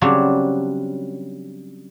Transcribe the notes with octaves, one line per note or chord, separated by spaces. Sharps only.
C#3 F#3 G3 C4 D4 C#5